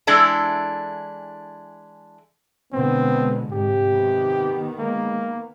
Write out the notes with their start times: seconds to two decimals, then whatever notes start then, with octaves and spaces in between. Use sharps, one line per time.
0.07 E3 G#3 D4 E4 A4
2.73 B2 D3 G#3 B3 C4
3.51 G#2 C3 G4
3.91 D#3 B3
4.79 G#3 A#3